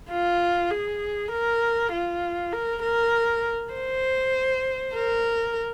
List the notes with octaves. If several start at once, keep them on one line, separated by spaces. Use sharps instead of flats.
F4
G#4
A#4
F4
A#4
A#4
C5
A#4